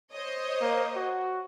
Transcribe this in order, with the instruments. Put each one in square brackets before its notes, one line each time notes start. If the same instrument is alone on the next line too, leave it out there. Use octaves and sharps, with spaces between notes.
[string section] C5 C#5 D#5
[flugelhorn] A#3
F#4